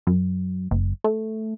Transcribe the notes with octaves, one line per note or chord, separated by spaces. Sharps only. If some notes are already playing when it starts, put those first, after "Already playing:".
F#2
F#1
A3